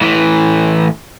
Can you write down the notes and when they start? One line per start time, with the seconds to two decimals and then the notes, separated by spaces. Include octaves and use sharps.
0.01 A2 E3